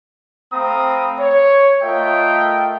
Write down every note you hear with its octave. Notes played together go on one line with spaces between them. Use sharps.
A3 C4 F5 A#5 B5 D#6
C#5
A3 F4 A#4 D#5 E5 G5